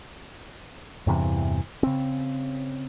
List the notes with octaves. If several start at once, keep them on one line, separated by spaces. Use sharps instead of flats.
E2 G2 C3 E3
C#3 C4